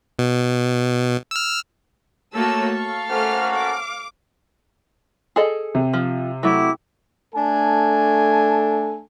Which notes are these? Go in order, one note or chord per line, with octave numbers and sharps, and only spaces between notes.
B2
E6 F6
A3 A#3 F#4 A4 C#5 A5 E6
F5 C#6
A3 A#3 C#4 F#4 C5 F6
D6
G#4 A4 D#5
C3
F3
F#3 A3 E4 D6
A3 D4 A4 G#5